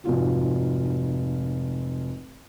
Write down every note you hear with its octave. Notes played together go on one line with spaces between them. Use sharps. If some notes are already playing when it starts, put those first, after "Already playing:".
F1 G#2 F4 F#4